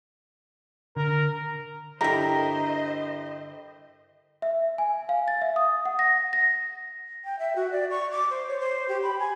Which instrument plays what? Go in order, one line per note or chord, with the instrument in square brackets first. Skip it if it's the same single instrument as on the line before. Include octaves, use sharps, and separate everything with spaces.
[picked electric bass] D3 [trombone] A#4
[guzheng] G2 D3 [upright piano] E4 G4 E5 [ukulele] A#4 [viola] C5 D#5
[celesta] E5
G#5
F5
A6
E5
D#6
F#5
A#6
A#6
[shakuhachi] G5
E5
F#4
D5
C#6
D6
C5
C#5
C5
G4
B5
G#5